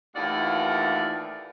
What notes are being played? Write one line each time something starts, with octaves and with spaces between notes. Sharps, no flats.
D#2 A2 E3 F4 D5 F#5